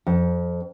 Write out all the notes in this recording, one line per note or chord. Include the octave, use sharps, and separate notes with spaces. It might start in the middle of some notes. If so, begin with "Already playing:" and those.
F2